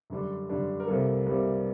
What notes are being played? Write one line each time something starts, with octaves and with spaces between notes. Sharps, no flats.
F#2 D3 G3 D4
F#2 D3 G3 D4
A#4
C2 C3 G3 A#3 A4
C2 C3 G3 A#3